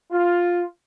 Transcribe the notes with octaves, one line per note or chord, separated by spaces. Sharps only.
F4